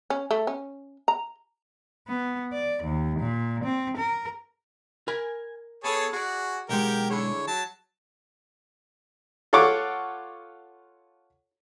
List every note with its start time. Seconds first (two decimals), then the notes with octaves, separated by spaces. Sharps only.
0.10 C#4
0.31 A3
0.47 C#4
1.08 A#5
2.07 B3
2.53 D5
2.83 D#2
3.19 A#2
3.64 C4
3.97 A#4
5.08 A#4 G#5 B5
5.84 B3 G#4 A4 C#5 A5
6.13 F#4 G#4 D5
6.69 B1 G#3 G4 A#4 F#5 G5
7.10 D3 E4 G#4 C#5
7.47 F#3 A5
9.53 F4 A4 C#5 F#5 C#6 D6